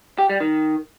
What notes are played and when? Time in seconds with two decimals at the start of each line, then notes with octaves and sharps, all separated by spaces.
0.18 G4
0.29 G3
0.40 D#3